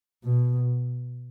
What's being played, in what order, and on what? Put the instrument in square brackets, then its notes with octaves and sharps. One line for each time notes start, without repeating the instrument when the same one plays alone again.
[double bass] B2